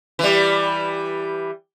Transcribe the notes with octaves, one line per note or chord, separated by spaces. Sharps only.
E3 G3